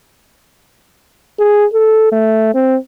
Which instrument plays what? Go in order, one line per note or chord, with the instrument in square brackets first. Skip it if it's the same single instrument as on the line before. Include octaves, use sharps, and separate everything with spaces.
[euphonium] G#4
A4
A3
C4